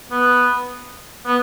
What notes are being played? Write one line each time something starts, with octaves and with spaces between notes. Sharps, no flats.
B3
B3